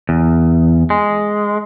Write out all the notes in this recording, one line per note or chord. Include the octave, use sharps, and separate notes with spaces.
E2
G#3